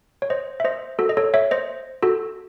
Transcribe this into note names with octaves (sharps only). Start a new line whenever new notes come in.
C#5
C5 D#5
E5
C5 D#5
F#4 A4
D#5
A4 C#5
C#5 E5
C5 D#5
F#4 A4